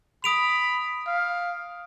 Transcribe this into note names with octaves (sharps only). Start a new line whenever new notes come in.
B5 D#6 D7 F7
F5